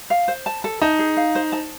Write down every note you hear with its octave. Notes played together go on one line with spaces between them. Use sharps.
F5
C5
A5
A4
D#4 A5
G#4
F5
C5
A5